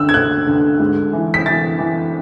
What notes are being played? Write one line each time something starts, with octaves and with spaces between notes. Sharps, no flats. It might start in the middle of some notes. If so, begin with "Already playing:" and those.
Already playing: D2 D3 E6 F#6
G#6
D2 F#6
D3
G#2
E3
B6
E3 A6
E3